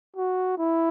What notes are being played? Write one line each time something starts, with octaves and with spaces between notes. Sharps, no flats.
F#4
E4